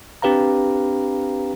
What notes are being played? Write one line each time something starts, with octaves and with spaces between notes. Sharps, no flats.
C4 D4 G4 B4 F5 A#5